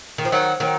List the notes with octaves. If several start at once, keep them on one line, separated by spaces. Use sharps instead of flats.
D#3
F3
D#3 F#3
D#3 F#3